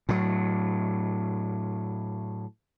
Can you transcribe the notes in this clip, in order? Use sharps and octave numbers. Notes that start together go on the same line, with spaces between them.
A2 F#3